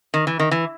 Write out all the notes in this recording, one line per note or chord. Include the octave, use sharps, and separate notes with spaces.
D#3
E3
D#3
E3